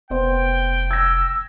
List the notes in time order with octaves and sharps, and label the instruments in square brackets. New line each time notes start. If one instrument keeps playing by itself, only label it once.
[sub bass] F1 [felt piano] B3 C5 [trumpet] G5
[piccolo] E6 [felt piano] G#6 A#6